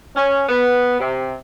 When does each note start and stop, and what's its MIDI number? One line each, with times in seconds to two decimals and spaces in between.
0.16 0.44 61
0.49 0.96 59
1.00 1.35 48